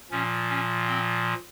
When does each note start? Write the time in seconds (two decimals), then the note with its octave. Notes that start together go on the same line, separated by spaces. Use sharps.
0.11 A#2 F3 C#4
0.49 C#4
0.87 C4